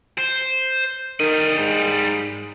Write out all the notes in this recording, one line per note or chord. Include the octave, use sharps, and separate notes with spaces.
C5
D#3 G3 D#5
G#2